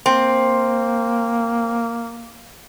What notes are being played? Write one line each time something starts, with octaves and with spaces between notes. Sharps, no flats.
A#3 C4